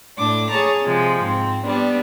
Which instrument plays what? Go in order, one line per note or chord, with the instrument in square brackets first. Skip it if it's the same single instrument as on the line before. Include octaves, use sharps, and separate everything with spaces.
[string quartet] A2 D4 D6
G#4 C#5 A5 A#5
C3 F3 G#3
G#2 C4
G3 B3 D4